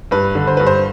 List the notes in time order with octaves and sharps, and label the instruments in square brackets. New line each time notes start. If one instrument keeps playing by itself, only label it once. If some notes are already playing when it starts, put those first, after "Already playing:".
[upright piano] G2 B4
D3
C5
G2 B4
C5